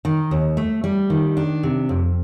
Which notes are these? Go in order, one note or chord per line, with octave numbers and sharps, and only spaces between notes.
D#3
D#2
A3
G3
D#3
D4
C3
F2